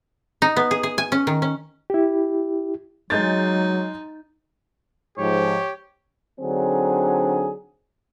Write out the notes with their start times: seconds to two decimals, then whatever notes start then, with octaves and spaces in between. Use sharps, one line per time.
0.42 D#4
0.56 B3
0.71 G#4
0.83 G#4
0.98 G#5
1.12 C#4
1.27 D#3
1.42 C#4
1.90 E4 G4
3.10 F#3 G#3 D#4 G6 A6
5.18 G#2 F3 G4 C#5
6.40 D3 F#3 C4 D4 D#4 G#4